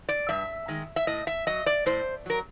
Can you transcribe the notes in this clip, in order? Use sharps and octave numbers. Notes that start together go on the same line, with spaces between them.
D5
G2 E5
D#3 G#3
E5
A2 D#5
E5
F#3 D#5
D5
A2 C5
F#3 A#4